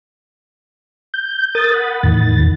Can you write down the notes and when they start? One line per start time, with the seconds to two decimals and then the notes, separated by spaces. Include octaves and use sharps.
1.14 G6
1.55 A#4 D#6 A6
1.74 F#5 B5
2.03 E2 A2 D#3 A6